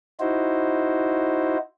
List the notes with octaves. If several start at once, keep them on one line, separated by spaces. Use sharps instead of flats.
D#4 E4 F#4 C5